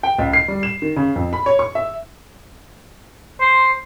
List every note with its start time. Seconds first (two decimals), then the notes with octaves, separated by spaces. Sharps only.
0.03 G5
0.18 C#2
0.33 C7
0.48 G3
0.63 E7
0.82 D#3
0.96 C#3
1.16 F2
1.33 B5
1.46 C#5
1.59 C#6
1.75 E5
3.41 C5